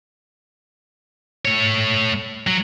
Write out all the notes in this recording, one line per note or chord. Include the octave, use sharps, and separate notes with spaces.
A3 C#5
F#3